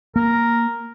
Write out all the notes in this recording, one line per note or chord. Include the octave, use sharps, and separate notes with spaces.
A#3 A#4